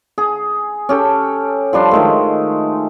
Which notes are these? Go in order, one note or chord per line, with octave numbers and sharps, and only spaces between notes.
G#4
C#4 G4 A4
F3 G3 D4 C6
D#3 G#3 A3